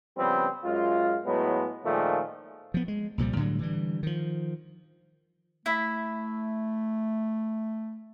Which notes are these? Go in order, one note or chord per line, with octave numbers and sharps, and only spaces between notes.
C#3 F3 G3 B3 C4
F#2 G#3 F4
A2 F#3 G#3 B3
A#2 D#3 F3 G#3 A3
F3 B3
G#3
C2 A#2 F3 G3
A2 D3 F#3 G3
D3 E3 G3
D#3 F3
A3 E4 E5